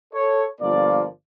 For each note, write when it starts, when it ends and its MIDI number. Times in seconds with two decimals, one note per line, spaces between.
0.14 0.43 69
0.14 0.43 73
0.60 1.06 31
0.60 1.06 53
0.60 1.06 58
0.60 1.06 65
0.60 1.06 74